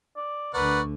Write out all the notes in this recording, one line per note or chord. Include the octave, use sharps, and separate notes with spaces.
D5
D2 D3 A#4 B4 D5 F#5 C#6